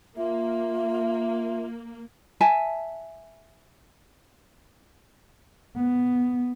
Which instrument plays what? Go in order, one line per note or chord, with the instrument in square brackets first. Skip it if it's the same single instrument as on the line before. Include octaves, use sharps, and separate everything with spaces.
[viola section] A#3 [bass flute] F4 [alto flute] E5
[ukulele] E5 G#5 A5
[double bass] B3